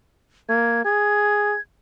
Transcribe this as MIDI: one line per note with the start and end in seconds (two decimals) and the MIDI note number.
0.49 0.82 58
0.49 0.84 92
0.84 1.55 68
0.84 1.61 92